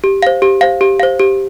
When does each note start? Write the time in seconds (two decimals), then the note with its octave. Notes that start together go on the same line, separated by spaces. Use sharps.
0.04 G4
0.23 C5 F5
0.42 G4
0.61 C5 F5
0.81 G4
1.00 C5 F5
1.19 G4